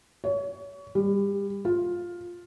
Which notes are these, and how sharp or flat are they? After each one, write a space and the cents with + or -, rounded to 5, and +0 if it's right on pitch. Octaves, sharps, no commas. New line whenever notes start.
C#5 +30
G3 +30
F4 +5